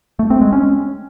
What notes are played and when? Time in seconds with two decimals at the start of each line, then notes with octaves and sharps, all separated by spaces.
0.19 A3
0.30 C4
0.41 G#3
0.53 C#4